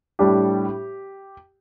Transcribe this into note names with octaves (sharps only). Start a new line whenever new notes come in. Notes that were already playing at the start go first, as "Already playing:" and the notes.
A2 G3 D4 G4